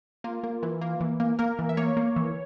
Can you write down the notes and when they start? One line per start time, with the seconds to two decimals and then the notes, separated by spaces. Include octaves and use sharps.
0.24 A#3 F4
0.43 A#3
0.63 E3
0.81 A#3
1.01 E3
1.20 A#3
1.39 A#3 A#4
1.59 E3
1.69 E5
1.77 A#3 C#5
1.97 A#3
2.16 E3